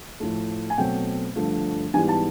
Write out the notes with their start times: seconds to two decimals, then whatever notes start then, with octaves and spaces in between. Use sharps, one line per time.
0.20 A2 F3 A3
0.70 G#5
0.77 B2 F#3 A3 C4 G5
1.35 G2 D3 F3 A3
1.94 G#2 E3 G3 B3 G#5
2.08 A5